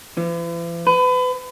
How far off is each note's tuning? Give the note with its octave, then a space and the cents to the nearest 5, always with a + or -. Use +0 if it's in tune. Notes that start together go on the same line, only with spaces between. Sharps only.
E3 +45
B4 +30